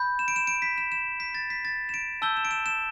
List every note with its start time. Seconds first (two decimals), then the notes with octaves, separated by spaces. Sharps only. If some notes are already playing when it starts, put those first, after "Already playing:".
Already playing: B5 G6
0.19 E7
0.28 D7
0.36 E7
0.47 D7
0.62 B6
0.78 E7
0.92 E7
1.20 B6
1.35 A6
1.50 B6
1.65 A6
1.89 E7
1.94 D7
2.22 A5 E6 G6 G7
2.37 E7
2.45 D7
2.51 E7
2.66 E7